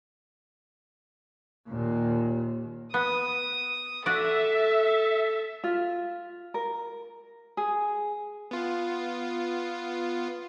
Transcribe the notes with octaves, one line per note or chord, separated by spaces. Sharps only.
D#2 A#2
B3 D#6
F#4 A4 D5 E5
F4
A#4
G#4
B3 F4